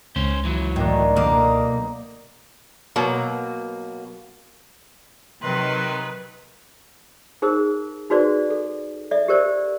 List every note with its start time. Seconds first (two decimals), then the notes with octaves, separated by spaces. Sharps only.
0.16 C#2 C#4 C5
0.45 E3 F#3
0.76 A2 D#3 D4
1.16 B1 D3 A#3 D#4 D6
2.96 B2 F#3 A#3
5.42 C3 D#3 F#3 B4 C6
7.42 D#4 G#4 A#4 C5 D#6
8.10 D#4 F#4 G#4 B4 C5 D5
8.50 A4
9.11 A4 D5 E5
9.28 G4 A#4 C5 D5